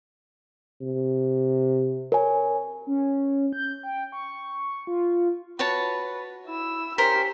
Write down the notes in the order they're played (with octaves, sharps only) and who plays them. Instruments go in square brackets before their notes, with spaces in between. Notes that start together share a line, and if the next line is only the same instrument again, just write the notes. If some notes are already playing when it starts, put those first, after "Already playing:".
[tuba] C3
[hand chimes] A#4 C#5 G#5
[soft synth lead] C#4
G6
G5
C#6
F4
[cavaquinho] F#4 C#5 A5 [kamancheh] B4
[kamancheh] E4 E6
[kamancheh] C#4 G4 [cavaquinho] A#4 C5 [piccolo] B6